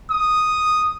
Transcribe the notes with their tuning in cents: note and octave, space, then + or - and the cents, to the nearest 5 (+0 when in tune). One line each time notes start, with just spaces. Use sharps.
D#6 -5